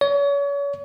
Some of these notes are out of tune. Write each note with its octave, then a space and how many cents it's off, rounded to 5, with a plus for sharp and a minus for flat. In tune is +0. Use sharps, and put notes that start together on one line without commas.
C#5 +35